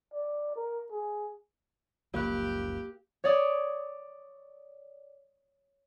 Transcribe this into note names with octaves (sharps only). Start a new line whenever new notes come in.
D5
A#4
G#4
F#1 C#2 F3 A#3 G4 F#6
C#5 D5 D#6